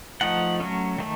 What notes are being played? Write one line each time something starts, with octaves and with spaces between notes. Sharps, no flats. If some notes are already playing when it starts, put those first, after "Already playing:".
F3 A3 D#4 F#5
F#3 A3 C#4
D#3 A3